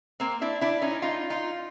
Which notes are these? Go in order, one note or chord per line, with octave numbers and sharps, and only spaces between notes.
A#3 C4
D4 E4
D4 E4
C#4 D#4
D#4 F4
D#4 F4